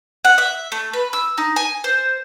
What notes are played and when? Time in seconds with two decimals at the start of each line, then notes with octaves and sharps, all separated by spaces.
0.25 F#5
0.38 E5
0.72 A3
0.93 B4
1.13 E6
1.38 D#4
1.56 G#5
1.84 C5